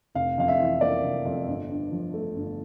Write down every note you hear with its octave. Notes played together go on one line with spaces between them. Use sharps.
F1 F5
F2 F5
E5
E3
A#3 D5
F1
F2
G1
G2
F3
A3
G1